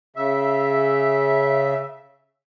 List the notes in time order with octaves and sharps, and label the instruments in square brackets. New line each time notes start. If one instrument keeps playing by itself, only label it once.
[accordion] C#3 E5